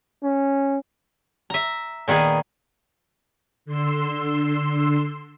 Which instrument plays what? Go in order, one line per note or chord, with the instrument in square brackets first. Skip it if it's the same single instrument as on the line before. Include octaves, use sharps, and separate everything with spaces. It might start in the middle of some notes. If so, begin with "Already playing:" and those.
[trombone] C#4
[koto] E5 A#5
A#2 D#3 B3 G#4
[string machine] D3 C6 E6